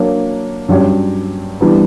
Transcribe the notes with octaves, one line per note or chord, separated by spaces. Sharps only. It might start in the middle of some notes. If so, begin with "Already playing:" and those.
Already playing: F#3 A#3 D4 A#4 C#5
G2 F#3 C#4 G4 C#5
E3 G3 B3 D4